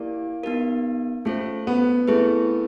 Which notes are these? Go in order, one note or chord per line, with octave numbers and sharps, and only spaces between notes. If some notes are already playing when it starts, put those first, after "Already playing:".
Already playing: A#3 E4 G4 A#4 D5
B3 D#4 G4 A#4
A3 C#4 F4 A4 C5
B3
A3 C4 E4 G#4 B4